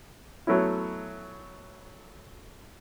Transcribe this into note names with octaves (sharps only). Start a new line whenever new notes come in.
F#3 A3 B3 C#4 E4